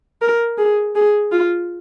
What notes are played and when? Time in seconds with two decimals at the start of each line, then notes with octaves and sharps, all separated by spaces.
0.22 A#4
0.58 G#4
0.95 G#4
1.32 F4